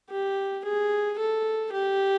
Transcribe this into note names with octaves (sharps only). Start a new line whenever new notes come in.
G4
G#4
A4
G4